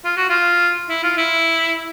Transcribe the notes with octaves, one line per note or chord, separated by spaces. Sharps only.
F4
F#4
F4
E4
F4
E4